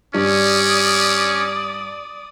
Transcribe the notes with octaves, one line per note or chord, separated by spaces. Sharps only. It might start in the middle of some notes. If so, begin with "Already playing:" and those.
G2 C#4 D5 D#6